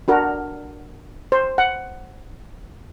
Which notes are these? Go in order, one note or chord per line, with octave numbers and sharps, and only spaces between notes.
D4 F#4 A#4
C5
F#5